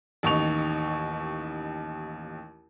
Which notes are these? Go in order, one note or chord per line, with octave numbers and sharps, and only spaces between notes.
A1 D#2 D#4 C#6 F7